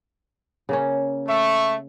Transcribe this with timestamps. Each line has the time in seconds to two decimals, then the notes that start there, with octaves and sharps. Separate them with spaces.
0.69 C#3 A#3 C#4
1.28 A3 E5 C#6